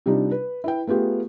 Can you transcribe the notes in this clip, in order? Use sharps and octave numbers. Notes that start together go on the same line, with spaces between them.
C3 G3 D4 D#4 F4
B4
E4 B4 G5
A3 B3 F4 G4 G#4